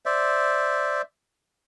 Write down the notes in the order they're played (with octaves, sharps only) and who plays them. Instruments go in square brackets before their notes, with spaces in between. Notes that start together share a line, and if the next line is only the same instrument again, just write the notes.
[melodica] C5 D5 E5